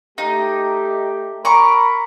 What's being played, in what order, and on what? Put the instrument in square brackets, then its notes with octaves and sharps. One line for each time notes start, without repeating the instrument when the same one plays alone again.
[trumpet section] A3 G4 [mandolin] D#4
[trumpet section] A#4 B5 [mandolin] A#5 C#6 D6